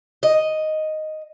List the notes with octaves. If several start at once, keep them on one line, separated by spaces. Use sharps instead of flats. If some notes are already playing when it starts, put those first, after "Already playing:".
D#5